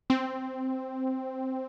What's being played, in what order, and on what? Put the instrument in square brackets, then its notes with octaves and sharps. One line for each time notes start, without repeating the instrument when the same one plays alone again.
[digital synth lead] C4